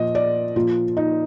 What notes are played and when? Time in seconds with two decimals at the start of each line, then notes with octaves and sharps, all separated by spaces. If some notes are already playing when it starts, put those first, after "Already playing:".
Already playing: A#2 F3 D#5
0.15 D5
0.56 A#2 F3 F4
0.97 D#4